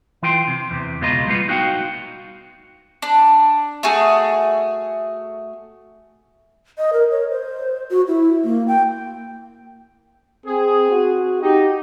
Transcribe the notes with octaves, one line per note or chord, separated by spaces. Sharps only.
E3 F4 G5 C6
C3
E2 C3
C#2 B2 G#3 F4 D#5 A#5
G3 A3 B3 F4
D#4 F#4 F5 G5
D4
A3 F#4 G#4
D#5
A#4
C#5
C5
F#4
E4
A#3
G5
C4 G#4
F#4
D#4 G4